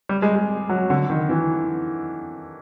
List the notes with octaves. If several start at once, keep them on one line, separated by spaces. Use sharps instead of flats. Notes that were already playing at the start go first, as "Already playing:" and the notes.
G3
G#3
G#3
F#3
D3
D#3
E3